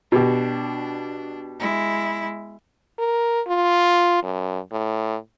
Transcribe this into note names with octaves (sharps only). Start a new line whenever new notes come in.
B2 D4 G4
G#3 E4
A#4
F4
F#2
A2